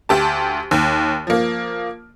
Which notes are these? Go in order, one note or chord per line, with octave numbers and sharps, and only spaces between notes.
D2 G4 A5
D#2
F3 A#3